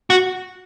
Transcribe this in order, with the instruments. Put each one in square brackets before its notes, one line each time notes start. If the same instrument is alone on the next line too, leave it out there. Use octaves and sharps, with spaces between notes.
[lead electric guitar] F#4